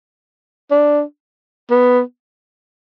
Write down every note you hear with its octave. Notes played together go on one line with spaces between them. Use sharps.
D4
B3